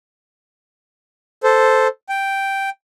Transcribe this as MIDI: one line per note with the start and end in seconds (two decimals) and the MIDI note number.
1.43 1.88 69
1.43 1.88 72
2.09 2.70 79